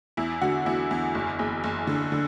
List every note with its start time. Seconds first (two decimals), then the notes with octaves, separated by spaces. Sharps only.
0.17 E2 E4
0.41 D3 F#4
0.66 E2 E4
0.91 E2
1.15 F#1
1.39 F#1
1.64 F#1
1.87 D3
2.12 D3